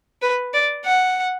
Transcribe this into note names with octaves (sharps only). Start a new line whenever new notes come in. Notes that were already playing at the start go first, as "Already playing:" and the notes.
B4
D5
F#5